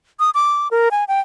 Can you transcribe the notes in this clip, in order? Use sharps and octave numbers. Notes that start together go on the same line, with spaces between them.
D#6
D6
A#4
G#5
G5